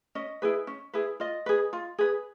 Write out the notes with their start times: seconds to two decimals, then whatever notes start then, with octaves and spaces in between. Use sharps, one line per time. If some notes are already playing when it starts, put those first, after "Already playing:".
0.15 C#4 D#5
0.42 E4 G#4 B4
0.67 C#4
0.94 E4 G#4 B4
1.20 F4 D#5
1.46 G#4 B4
1.73 F4
1.98 G#4 B4